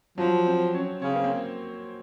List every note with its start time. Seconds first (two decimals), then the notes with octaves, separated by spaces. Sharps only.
0.18 F3 F#3
0.47 C4
0.74 C#4
1.02 C#3 C#4
1.09 C4
1.16 A#3
1.24 C4